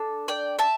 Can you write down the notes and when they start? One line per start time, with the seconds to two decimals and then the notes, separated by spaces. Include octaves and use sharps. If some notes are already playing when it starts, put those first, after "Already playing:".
Already playing: D4 A4
0.28 D5 G5
0.59 E5 A5